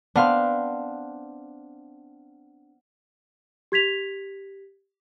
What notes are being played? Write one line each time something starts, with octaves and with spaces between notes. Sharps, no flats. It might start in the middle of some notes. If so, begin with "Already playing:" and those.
B3 C4 D4 F5
G4 G#6 B6 F7